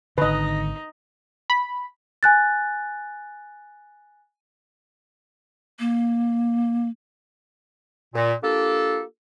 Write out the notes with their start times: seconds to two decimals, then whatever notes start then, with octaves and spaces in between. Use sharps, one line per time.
0.18 G#1 D3 D#4 B4 D#5
1.50 B5
2.23 G#5 F#6 A6
5.79 A#3
8.14 A#2
8.42 A#3 D4 F4 G4 A4